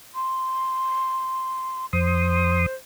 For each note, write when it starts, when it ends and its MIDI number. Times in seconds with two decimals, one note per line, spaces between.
0.15 1.86 84
1.93 2.66 41
1.93 2.75 72
1.93 2.66 84
1.93 2.66 87